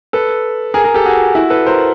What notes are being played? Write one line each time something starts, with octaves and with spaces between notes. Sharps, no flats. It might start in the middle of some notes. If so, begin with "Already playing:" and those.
A4 B4
G#4 A#4
G#4 A#4
G4 A4
F#4 G#4
E4 F#4
A4 B4
A#4 C5